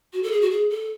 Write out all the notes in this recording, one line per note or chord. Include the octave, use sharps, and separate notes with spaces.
F#4
A4
G#4
F#4
G#4
A4